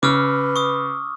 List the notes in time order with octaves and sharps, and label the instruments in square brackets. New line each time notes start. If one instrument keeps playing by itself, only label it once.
[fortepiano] C#3 [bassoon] B4 [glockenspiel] D6 E6 F6
[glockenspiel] C#6 D#6